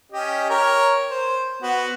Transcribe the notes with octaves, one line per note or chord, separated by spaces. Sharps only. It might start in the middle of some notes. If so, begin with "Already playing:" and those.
C#4 G4 D#5
A#4 C#5
C5
B3 F#4